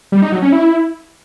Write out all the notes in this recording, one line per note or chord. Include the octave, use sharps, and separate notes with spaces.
G3
D#4
F#3
C#4
E4